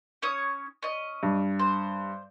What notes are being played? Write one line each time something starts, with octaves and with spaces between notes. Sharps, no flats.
C#4 C#5 D#6
C#4 D#5
G2
C5